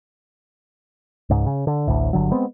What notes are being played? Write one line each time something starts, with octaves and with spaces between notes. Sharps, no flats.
C#2 G#2
C#3
D3
A1 D2 A2
G1 D3 F#3
G#3 B3 C4